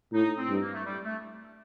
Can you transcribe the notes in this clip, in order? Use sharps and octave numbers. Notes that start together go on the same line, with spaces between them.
A2 D#4
C4
G2
A#3
A3
G3
A3